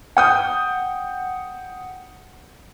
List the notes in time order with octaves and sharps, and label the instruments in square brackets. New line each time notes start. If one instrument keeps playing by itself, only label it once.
[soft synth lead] F#5 [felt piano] G5 D#6 G6